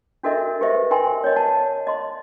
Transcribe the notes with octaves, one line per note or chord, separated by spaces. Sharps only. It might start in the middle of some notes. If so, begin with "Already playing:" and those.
D4 F#4 A4 A#4 D#5 E5
G4 B4 C5 D#5 E5
A#4 G5 G#5 C6
C#5 D#5
F#5 A5
D#5 C6